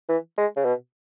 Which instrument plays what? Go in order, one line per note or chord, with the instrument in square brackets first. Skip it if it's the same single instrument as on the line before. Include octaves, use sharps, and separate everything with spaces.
[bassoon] E3
G#3
C#3
B2